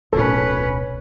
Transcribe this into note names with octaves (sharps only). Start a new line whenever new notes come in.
D1 B1 C#4 A4 B4